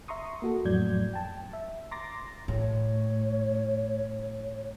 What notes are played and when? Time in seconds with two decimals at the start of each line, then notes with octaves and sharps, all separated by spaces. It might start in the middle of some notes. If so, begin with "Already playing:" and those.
0.08 E5 A#5 C6 C#6 D#6
0.42 A#3 F#4 A4
0.65 F2 A2 F#3 D5 G6 G#6
1.14 G5 A5
1.53 E5
1.91 A#5 C6 D6 A6 A#6
2.48 A2 C#5